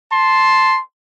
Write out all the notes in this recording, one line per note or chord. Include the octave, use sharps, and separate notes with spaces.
A5 C6